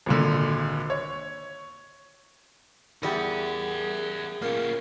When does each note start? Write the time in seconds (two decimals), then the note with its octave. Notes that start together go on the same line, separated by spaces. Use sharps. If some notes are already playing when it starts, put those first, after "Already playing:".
0.06 G#1 A#2 D3
0.90 C#5
3.03 E2 G3 G#4 A#4 D5 F#5
4.42 A#2 A#3 C#4 F5